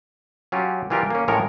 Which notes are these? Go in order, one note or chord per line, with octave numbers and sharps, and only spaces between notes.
F#3 C#4 F4 G4
E3 G3 F4 G4 A#4
A#3 C#4
A1 A2 F3 G#3 A#4 C#5